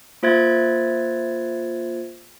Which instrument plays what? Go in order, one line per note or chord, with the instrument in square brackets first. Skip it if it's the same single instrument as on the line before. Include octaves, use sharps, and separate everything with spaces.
[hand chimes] A#3 F4 C5 E5 G#6 A6